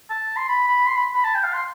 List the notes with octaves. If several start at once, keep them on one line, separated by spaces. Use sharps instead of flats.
A5
C6
B5
B5
C6
B5
B5
A5
G5
F5
C6